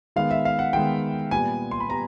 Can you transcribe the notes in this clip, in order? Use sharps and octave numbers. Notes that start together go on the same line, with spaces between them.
D#3 G#3 B3 F5
E5
F5
F#5
D#3 G#3 B3 G5
A#2 G3 B3 G#5
C6
B5
A#2 G3 B3 A#5